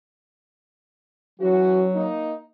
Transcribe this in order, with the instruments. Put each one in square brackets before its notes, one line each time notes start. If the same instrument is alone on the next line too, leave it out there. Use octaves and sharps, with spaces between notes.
[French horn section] E3 C#4 F#4 [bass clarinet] F#3
[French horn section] A#3 D#4